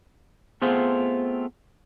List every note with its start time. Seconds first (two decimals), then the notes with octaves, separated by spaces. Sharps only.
0.62 A3 B3 C4 F4 G#4 C5